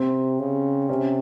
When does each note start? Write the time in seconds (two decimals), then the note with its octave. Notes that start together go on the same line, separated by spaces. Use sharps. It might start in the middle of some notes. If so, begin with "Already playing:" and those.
Already playing: C3 C4
0.39 C#3
0.89 C3 C#4